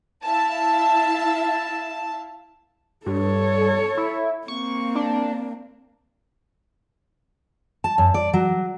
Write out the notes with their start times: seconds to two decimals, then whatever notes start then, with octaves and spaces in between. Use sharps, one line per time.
0.24 E4 E5 F5 A5
3.06 G2 A4 C#5
3.97 E4
4.48 A#3 C4 C#6
4.95 D4
7.84 A5
7.98 F#2
8.14 D5
8.33 F#3